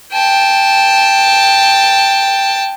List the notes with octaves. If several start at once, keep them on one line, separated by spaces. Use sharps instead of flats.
G5 A5